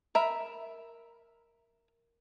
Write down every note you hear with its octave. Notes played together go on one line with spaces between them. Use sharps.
A#4 E5 B5